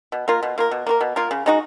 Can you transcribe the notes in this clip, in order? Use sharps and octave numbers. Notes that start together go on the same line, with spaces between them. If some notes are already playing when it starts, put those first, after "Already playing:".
B2
A#3 F4 A#4
B2
A#3 F4 A#4
B2
A#3 F4 A#4
B2
A#3 F4 A#4
C#3
G#3 D#4 F#4